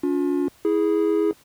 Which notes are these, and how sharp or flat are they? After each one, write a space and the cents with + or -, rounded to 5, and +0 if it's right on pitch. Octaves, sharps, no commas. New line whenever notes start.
C#4 +45 F4 +35
E4 -15 G#4 +0